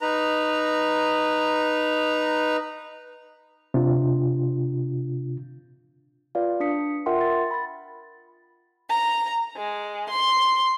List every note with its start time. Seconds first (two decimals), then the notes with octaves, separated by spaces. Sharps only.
0.01 D#4 B4 A#5
3.74 C3 D4 F4
6.35 F4 B4 D5 F5
6.60 D4 D#6 B6 C#7
7.06 F4 A#4 E5 F#5 G5 C6
7.21 A6
7.51 B5 A6
8.89 A#5
9.56 G#3
10.09 C6